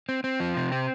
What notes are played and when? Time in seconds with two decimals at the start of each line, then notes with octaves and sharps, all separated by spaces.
0.09 C4
0.24 C4
0.40 F3
0.57 C3
0.72 C4